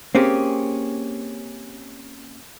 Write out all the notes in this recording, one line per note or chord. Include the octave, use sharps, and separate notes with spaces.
A#3 C4 C#4 G4 G#4